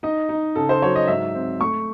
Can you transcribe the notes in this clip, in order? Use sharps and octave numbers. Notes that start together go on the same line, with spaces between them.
D#4 D#5
D#4
C#3 A4
C5
F#3 C#5
D#5
G#2 E5
C4
A3 C#6